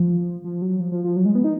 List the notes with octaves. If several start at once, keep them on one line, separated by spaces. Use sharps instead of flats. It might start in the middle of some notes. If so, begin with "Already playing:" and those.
Already playing: F3
F3
F#3
F3
F3
F3
F#3
G#3
B3
D#4